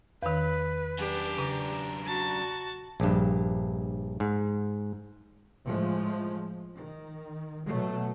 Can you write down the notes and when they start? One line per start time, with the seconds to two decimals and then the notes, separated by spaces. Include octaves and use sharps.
0.23 E2 D#3 B4
0.99 F#2 D4 G4
1.38 C#3 A#5
2.06 F#4 A5
3.00 A#1 G2
4.20 G#2
5.66 A2 F3 G#3 A3
6.78 D#3
7.67 B2 F#3 A3